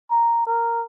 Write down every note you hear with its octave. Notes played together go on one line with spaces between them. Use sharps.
A#5
A#4